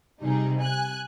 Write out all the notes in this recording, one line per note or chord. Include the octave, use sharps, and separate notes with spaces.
C3 G3 D#4 G#4
G#5 F#6